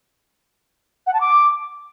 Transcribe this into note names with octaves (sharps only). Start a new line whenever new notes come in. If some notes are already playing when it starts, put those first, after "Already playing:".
F#5
A5
D6